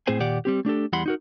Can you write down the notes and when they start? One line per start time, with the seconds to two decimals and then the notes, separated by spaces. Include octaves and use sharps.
0.07 A2 C4 G#4 C5 G#5
0.20 D#2 A#2 G4 D5 F#5
0.45 G3 C4 G4
0.65 A3 D4 G4 A4
0.93 E2 G3 E4 F#5 B5 C6
1.06 D#4 F#4 A#4